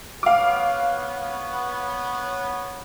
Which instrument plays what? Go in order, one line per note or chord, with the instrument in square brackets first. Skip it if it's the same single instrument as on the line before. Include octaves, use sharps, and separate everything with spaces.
[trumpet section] B3 C#5 [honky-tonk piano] F5 D6